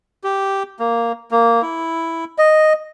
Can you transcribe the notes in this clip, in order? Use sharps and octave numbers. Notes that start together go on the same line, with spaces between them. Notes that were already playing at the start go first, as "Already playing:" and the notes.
G4
A#3
A#3
E4
D#5